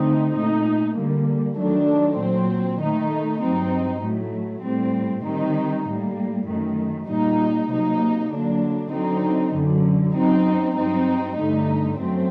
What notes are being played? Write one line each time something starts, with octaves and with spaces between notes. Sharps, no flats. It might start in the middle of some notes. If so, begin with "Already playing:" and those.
Already playing: D3 A3 C4 D#4
A#2 A3 D#4
D3 G3 A#3
D#3 F#3 A3 D4
A#2 F#3 C4
D#3 A3 D#4
G2 F#3 C4 D#4
A2 F#3 A3
A2 G3 C4
D#3 G3 C4 D#4
A2 G3 A#3
F#2 D#3 A3
A#2 G3 A#3 D#4
C3 F#3 A#3 D#4
D3 F#3 A#3 D4
D3 F#3 C4 D#4
F#2 D3 F#3
F#2 F#3 C4 D#4
G2 F#3 C4 D#4
G2 D3 A3 D#4
F#2 F#3 A3 C4